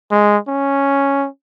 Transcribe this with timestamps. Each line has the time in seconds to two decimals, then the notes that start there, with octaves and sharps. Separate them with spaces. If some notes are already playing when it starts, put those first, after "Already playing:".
0.11 G#3
0.48 C#4